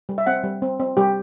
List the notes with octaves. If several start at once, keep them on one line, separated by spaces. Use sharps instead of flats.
G3
E5
C4 F#5
G3
C4
C4
G3 G4